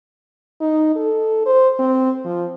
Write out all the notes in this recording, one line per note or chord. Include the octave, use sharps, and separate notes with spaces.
D#4
A4
C5
C4
F3